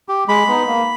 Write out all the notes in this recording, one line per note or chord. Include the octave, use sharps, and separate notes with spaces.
G4
G#3 B5
B3 D#4
A#3